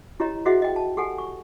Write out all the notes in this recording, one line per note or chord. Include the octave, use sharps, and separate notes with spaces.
E4 G4 C#5 D#5 A#5
F#4 G#4 C5 D#5 E5 F#5
D#5 G5
A5
G4 A4 F#5 G#5
C#6